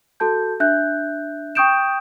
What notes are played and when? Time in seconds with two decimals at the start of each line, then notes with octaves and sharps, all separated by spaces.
0.20 F#4 A4 A5 G6
0.60 D4 E5 F#6 G6
1.55 G5 C#6 D#6 G6 D7 E7